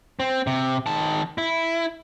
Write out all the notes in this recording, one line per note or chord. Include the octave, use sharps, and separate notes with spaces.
C4
C3
D#3 A5
E4